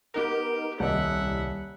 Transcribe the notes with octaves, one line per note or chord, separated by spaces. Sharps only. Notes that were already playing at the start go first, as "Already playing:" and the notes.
B3 D#4 G4 A#4
D#1 C2 G3 D#5 E5 F#5